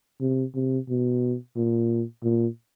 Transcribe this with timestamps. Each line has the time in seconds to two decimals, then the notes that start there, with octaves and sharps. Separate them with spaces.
0.20 C3
0.55 C3
0.89 B2
1.56 A#2
2.23 A#2